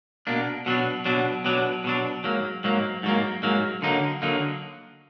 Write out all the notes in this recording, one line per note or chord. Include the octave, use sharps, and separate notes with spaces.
B2 A#3 D4
B2 F#3 D4
B2 F#3 D4
B2 F#3 D4
B2 F#3 D4
G#2 F#3 A#3
G#2 F#3 A#3
G#2 F#3 A#3
G#2 F#3 A#3
D3 F#3 A#3 D#4
D3 F#3 A#3 D#4